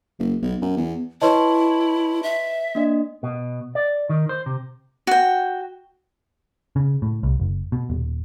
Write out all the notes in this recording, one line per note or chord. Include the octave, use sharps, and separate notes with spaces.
F#1
B1
F#2
E2
E4 B4 C#5 D#5 A5 C6 C#6
E5
A#3 D4 D#5
B2
D5
D#3
C5
C3
F#4 G5
C#3
A2
C2
F#1
B2
D#1